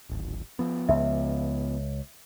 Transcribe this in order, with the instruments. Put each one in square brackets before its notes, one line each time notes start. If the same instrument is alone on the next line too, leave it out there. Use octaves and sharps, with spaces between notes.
[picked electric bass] D1 G#1
F3 B3
[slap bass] C#2 [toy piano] E5